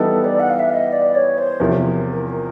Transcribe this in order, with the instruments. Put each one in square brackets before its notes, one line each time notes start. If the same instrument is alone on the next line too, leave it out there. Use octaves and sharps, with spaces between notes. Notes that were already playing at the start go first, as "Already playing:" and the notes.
Already playing: [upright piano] E3 G3 B3 D#4 [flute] A4
[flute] D5
F#5
F5
E5
F5
D#5
D5
C#5
C5
[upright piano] E2 C3 F3 [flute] A#4